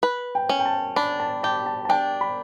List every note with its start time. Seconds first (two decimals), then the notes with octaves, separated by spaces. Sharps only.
0.03 B4
0.35 G5
0.49 C#4
0.59 G5
0.66 A5
0.96 D4 B5
1.20 A5
1.43 G4 A5
1.66 A5
1.85 A5
1.89 D4 G5
2.21 B5